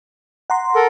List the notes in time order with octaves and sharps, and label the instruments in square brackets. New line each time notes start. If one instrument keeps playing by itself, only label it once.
[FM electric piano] F#5 A#5 C6
[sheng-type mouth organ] A4 A#4